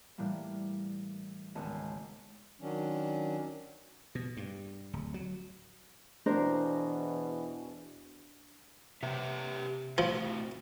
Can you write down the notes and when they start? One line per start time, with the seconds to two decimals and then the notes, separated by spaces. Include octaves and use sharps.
0.18 A2 E3 G3 A#3
1.55 G#1 C#2 B3 C#4 D#5 A5
2.60 D#3 F#3 C#4 D4
4.15 B2
4.37 G2
4.93 D1
5.14 F#3
6.26 E2 B2 E3 D4 A#4 C5
9.03 C3 G4 B4 E5
9.98 A2 F3 F#4